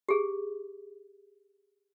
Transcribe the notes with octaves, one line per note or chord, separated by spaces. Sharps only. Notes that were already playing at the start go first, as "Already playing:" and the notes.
G4 G#4